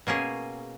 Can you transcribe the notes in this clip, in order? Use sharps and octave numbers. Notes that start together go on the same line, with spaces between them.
B2 A#3 C#4 G#4